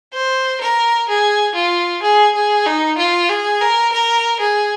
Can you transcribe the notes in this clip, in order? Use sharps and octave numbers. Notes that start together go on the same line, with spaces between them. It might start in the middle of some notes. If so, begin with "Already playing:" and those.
C5
A#4
G#4
F4
G#4
G#4
D#4
F4
G#4
A#4
A#4
G#4